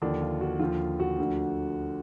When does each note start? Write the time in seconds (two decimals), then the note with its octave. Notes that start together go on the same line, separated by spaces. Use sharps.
0.02 D#2 D3 F3 D4
0.22 F4
0.41 F#4
0.60 D#2 D3 F3 F4
1.00 F#4
1.18 D2 D3 F3